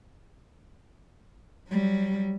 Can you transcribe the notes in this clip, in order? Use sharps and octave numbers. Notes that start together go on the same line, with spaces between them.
F#3 G3